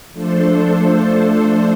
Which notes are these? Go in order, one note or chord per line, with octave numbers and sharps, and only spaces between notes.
F3 A3 D4 A4 C5